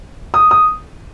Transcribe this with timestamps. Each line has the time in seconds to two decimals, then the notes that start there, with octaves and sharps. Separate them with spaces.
0.34 D#6
0.51 D#6